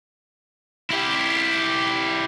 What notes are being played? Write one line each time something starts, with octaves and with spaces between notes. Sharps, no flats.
E4 G4